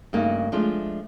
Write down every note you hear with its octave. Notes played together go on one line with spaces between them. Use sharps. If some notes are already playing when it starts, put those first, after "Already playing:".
G2 C#3 A3 A#3 D#4 F#4
F3 G#3 A3 D4 F4